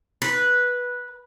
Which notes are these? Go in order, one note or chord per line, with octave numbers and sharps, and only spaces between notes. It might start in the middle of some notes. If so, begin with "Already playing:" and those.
B4